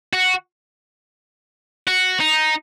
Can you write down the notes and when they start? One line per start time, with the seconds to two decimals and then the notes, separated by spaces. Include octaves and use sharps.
0.13 F#4
1.87 F#4
2.20 D#4